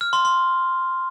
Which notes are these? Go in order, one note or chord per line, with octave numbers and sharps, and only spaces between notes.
F6
C6
C6